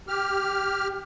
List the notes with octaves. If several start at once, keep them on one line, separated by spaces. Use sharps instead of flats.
G4 F6